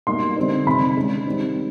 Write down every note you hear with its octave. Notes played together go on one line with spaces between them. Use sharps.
B2 G3 A#3 D#4 C6
D3 G3 C4 D#4
C3 D#3 G3 C4 D#4 B5
D#3 G#3 C#4
D#3 G3 C4 D#4